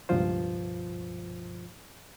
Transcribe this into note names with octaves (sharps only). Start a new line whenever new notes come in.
C#2 G2 B2 F3 F4 C5